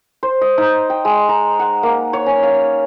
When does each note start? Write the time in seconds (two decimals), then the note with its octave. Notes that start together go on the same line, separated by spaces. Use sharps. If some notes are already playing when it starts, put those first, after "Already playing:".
0.23 C5
0.41 D#5
0.58 D#4
0.90 G5
1.05 G#3
1.29 A#5
1.59 F#5
1.83 A#3
2.13 C#5
2.26 C#4
2.43 F5